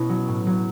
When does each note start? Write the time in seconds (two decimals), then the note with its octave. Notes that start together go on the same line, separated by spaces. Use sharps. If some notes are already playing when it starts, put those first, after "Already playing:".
Already playing: B2 B3 C#4 E4
0.09 F#3
0.28 A2
0.46 F#3